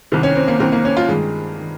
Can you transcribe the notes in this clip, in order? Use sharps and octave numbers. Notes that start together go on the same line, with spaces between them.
C2 C3 D#3
C#4
C4
A#3
C2 C3 D#3 C4
A#3
C#4
F4
G2 D#3 G#3
D#3